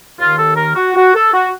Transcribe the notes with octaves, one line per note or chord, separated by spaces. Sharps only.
D#2 D#3 F4
A4
A#4
F#4
F#4
A4
F#4